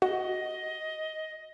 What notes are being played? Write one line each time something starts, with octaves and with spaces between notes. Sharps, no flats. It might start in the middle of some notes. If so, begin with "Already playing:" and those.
F#4 D#5